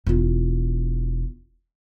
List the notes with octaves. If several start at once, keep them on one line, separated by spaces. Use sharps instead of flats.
E1 F4